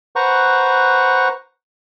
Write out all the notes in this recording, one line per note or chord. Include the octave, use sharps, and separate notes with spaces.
B4 C5 F#5 A#5 C#6